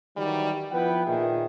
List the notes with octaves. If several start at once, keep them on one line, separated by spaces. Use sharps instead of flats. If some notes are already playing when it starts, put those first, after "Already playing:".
D#3 E3 F#3 G3 F#4 G4
F3 B3 E4 B4 F#5 G5
A#2 D#3 B3 G#4 B4 E5